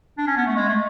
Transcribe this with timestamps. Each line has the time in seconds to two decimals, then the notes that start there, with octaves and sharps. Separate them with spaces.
0.18 D4
0.27 C#4
0.37 B3
0.46 A3
0.55 G#3
0.68 A3